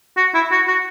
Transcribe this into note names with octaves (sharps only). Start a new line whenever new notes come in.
F#4
E4
F#4
F#4